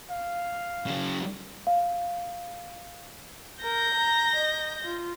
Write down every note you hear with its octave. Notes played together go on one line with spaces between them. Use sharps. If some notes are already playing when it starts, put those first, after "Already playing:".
F5
C#3 F#3
F5
A#4 G6 A#6
A#5
D#5
F4